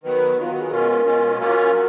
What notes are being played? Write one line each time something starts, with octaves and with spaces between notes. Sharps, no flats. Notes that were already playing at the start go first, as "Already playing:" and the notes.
D#3 F#3 B3 B4
D#3 F#3 B3 F4
F#4
G#4
B2 G#3 C#4 F4 A#4
B2 G#3 C#4 F4
F#3 A#3 C#4 F4 A#4
F#3